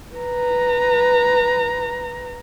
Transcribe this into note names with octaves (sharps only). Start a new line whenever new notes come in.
B4 A#5